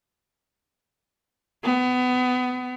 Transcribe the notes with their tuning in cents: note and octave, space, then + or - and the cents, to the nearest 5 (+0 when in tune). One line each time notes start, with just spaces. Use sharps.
B3 +25